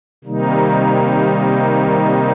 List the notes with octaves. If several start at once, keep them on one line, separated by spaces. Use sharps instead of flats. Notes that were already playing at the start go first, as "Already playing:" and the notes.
C3 D#3 G3 A#3 D#4